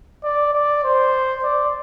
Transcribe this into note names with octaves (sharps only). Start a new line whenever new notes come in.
D5
D5
C5
D5